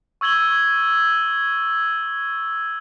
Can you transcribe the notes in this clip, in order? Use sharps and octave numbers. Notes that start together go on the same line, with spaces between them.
C#6 E6 G#6 F#7 G7